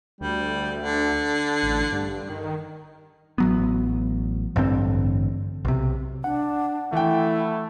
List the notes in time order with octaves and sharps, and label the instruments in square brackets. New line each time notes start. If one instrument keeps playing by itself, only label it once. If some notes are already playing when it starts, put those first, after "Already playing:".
[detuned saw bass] D2 [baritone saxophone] G3
[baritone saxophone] D3
[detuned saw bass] A1
G2
D#3
[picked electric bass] A1 F#3 B3
A1 G2 D3 C4
B1 C3
[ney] D4 [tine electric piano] F#5
[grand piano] E3 G5 [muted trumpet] A3 [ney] E4